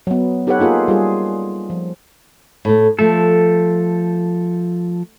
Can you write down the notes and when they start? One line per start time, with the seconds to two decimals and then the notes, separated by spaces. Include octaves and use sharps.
0.07 F#3 B3
0.47 D#4 G4 A4 B4 C#5 F#5
0.60 A#3 D#4 F4 G#4 A#4
0.88 G3 F4 G#4
1.70 F3
2.65 A2 A3
2.99 F3 A3 A4